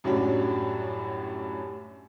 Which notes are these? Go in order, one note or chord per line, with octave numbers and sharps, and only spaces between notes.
F#2 A2 F#3 G3 C#4 D4